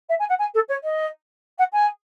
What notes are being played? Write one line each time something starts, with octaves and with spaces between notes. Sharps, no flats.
E5
G#5
F#5
G#5
A4
C#5
D#5
F#5
G#5